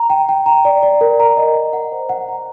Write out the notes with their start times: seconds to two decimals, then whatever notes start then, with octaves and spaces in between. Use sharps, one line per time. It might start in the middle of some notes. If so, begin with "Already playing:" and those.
Already playing: A#5
0.10 G5
0.29 G5
0.46 A#5
0.65 D5
0.83 D5
1.01 A#4
1.20 A#5
1.37 D#5
1.55 A#5
1.73 F#5
1.92 C5
2.09 F#5
2.29 A#5